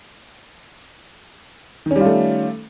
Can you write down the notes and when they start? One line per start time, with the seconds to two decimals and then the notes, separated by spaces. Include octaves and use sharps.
1.86 D#3
1.91 C#4
1.96 G3
2.01 F4
2.05 A3